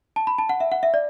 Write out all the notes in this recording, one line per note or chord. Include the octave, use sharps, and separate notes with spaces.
A5
B5
A5
F#5
E5
F#5
E5
D5